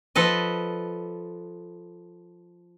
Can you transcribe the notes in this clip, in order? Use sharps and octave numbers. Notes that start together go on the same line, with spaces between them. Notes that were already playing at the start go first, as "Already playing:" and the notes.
F3 A4 B4 D#5